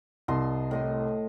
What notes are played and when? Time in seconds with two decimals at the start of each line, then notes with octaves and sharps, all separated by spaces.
0.28 C2 D#5 A5 C6
0.71 A2 D#5 C6